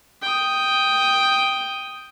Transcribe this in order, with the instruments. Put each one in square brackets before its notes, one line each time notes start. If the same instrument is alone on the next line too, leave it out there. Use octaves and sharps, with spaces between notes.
[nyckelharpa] G5 D#6